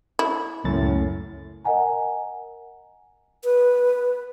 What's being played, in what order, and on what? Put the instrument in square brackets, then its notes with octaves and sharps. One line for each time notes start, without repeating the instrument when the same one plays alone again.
[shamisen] E4
[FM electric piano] C#2 A6 [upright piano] F#2 [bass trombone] A2
[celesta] A#4 D#5 F#5 G#5 A#5
[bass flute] B4